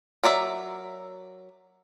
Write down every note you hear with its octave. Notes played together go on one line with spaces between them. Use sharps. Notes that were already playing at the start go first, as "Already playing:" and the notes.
F#3 A#4 D5 E5